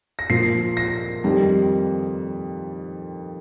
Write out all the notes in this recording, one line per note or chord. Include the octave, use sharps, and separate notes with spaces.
A#6
A#2 F3 C7
A#6
F2 D#3 G3